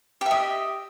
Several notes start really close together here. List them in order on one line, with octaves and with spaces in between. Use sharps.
G4 E5 D#5